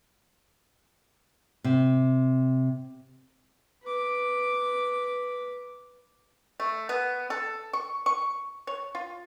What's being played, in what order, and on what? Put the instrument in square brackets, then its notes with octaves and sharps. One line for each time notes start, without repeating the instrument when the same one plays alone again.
[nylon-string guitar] C3
[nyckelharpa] B4 D6
[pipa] A3
B3
A4
C#6
C#6
C#5
F4